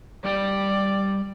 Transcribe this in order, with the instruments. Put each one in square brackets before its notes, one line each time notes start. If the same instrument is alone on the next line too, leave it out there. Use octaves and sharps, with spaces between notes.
[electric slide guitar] G3 G4 G5 [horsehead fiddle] D5